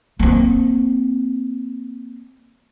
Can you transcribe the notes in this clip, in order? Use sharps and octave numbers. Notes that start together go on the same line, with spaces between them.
A#3 C4